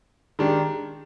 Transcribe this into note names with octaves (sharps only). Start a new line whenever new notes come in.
D#3 G#3 D4 G4